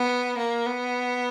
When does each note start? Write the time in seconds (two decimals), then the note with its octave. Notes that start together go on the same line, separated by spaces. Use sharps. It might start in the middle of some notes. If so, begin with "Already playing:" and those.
Already playing: B3
0.37 A#3
0.66 B3